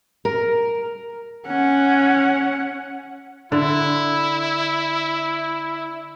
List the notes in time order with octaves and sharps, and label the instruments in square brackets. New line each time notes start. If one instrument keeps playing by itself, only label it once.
[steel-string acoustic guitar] A#4
[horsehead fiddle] C#4 F#5
[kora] D3 [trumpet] E4